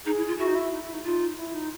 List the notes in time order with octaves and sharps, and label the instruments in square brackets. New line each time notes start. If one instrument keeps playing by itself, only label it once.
[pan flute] D#4 [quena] G#4
[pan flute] E4
F4
[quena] E4 [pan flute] F#4
[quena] D#4
E4
D#4
E4
D#4
[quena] D#4 [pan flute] F4
[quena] E4
D#4